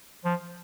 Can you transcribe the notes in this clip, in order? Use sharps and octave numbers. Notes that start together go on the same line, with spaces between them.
F3